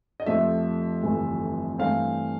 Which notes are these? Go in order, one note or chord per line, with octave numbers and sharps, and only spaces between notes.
D#5
F2 C3 F3 A3 C4 E5
G1 F2 C3 E3 A3
G2 E3 A3 C4 F5